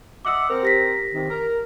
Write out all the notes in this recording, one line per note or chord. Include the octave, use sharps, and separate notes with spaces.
D#5 E5 F#5 D6 E6
C4 A#4
G4 A#6 B6
C3 D#3
A#4